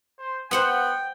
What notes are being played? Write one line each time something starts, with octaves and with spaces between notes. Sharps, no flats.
C5
B3 C5 F#5 G5 C6